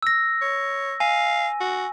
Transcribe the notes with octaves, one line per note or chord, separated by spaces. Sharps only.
E6 A#6
C#5
F5 G#5
F#4